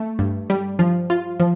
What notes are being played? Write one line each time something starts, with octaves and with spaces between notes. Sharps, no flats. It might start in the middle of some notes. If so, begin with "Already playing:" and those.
Already playing: A3
G2
G3
F3
F4
F3